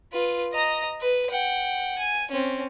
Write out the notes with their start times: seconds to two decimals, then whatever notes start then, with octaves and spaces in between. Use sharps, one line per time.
0.13 F4 B4
0.53 D#5 A#5
1.01 B4
1.31 F#5 G5
1.99 G#5
2.31 C4 C#4